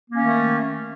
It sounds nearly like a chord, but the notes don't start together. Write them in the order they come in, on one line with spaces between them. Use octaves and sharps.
A#3 C#4 D#3 A3